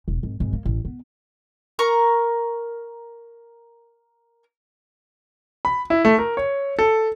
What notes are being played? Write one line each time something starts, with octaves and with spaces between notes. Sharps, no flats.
E1
G#1
G#1
A#3
A1
B3
A#4 A#5 C#6
B5
E4
A3
A#4
C#5
A4